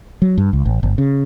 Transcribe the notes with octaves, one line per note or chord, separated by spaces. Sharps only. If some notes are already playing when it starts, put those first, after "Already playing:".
F#3
G2
C#2
A1
G1
C#3